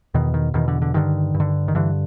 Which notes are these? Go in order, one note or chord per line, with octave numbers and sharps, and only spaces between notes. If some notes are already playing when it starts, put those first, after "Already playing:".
E2 B2 D#3
D#3
E2 B2 D#3
D3
D3
G2 D3 D#3
G2
D3
D#3
G2 D3 E3